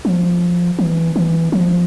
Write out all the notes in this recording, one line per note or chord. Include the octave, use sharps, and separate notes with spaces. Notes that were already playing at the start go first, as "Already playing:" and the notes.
F3
E3
E3
F3